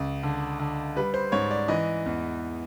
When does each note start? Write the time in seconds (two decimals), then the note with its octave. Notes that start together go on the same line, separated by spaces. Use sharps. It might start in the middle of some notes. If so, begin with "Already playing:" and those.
Already playing: C#2
0.23 D3
0.60 D3
0.96 G3 B4
1.14 C5
1.32 G#2 C#5
1.51 D5
1.68 E3 D#5
2.06 E2